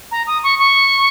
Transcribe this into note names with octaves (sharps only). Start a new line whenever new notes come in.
A#5
D#6
C#6
C#6